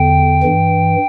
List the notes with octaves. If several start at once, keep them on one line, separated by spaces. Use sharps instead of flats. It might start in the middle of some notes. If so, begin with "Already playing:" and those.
Already playing: E2 D3 G5
G2 E3